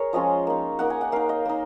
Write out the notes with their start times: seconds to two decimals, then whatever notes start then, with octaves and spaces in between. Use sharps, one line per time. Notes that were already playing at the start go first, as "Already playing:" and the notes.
Already playing: G#4 A#4 C#5
0.13 F3 G#3 C#4 F4 D#5
0.47 A#3 D#4
0.79 A#3 D#4 F#5
0.90 G#5
1.01 F#5
1.12 A#3 D#4 F5
1.29 D#5
1.45 A#3 D#4